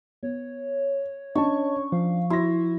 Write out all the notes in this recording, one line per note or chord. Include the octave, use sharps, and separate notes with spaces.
B3 C#5
C#4 D4 D#5 A5 C#6
F3 F5
E4 F#4 C6 A#6